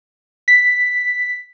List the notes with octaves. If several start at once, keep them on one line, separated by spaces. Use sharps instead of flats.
B6